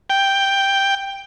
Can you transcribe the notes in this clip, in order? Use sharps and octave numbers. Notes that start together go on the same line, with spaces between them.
G5